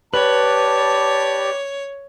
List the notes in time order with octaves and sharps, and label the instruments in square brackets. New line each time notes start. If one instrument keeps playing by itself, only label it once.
[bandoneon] G4 D5 [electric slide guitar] B4 [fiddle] C#5 [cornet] A5